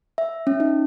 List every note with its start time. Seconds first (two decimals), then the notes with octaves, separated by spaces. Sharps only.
0.18 E5
0.47 C#4
0.60 D#4